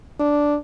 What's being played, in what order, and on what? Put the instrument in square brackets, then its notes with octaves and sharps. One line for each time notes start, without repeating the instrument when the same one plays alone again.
[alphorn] D4